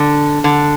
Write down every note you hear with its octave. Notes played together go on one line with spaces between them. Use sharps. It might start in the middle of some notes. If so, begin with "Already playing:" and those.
Already playing: D3
D3